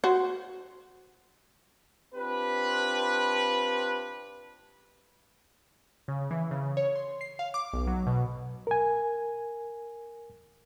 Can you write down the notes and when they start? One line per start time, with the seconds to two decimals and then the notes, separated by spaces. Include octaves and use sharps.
0.04 F#4 C5
2.15 C4 D4 F4 G4 B4
6.08 C#3
6.31 E3
6.51 C#3
6.77 C#5
6.96 C6
7.21 C7
7.39 F5
7.54 D6
7.73 B1
7.87 F#3
8.07 B2
8.67 A#4 G#5